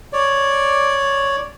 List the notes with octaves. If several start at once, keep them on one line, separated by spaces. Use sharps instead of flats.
C#5 D5